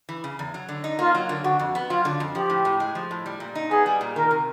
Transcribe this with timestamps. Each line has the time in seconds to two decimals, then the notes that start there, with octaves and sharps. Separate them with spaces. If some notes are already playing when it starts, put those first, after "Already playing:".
0.09 E3
0.24 C#3
0.39 E2
0.54 F#3
0.69 D3
0.84 D#4
0.99 A#3 F4
1.15 F#3
1.29 D3
1.44 D3 F#4
1.59 F2
1.75 B3
1.89 F#3 F4
2.05 D3
2.20 F2
2.35 F3 G4
2.50 A2
2.65 A2
2.80 G#3
2.95 F3
3.11 A2
3.26 G3
3.40 A#2
3.55 D#4
3.70 B3 G#4
3.86 G3
4.01 A#2
4.16 D#3 A#4
4.31 C3